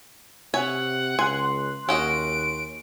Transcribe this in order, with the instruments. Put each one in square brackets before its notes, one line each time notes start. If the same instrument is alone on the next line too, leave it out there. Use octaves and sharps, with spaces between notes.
[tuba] C3 [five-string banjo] C#5 E5 G#5 [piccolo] F#5
[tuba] C#2 [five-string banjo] G#5 [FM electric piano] C6 F#6
[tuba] D#2 [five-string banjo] C#4 F#4 D#5 [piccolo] D7